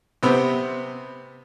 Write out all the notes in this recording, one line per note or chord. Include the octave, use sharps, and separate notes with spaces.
C3 B3 C4